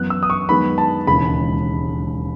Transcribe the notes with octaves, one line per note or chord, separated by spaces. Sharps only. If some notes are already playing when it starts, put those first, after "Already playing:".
Already playing: F#2 E3 B3 F#6
E6
D#6
C#6
F#2 D#3 G#3 B3 B5
A5
E1 D#2 C#3 E3 G#3 B5